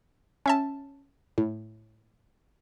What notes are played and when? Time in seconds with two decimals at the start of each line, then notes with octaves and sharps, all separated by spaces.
0.46 C#4 E5 A5
1.38 A2